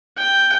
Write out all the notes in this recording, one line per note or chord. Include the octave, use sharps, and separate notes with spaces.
G5